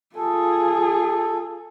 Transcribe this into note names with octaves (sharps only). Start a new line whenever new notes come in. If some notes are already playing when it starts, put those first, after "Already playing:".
F4 G#4 A4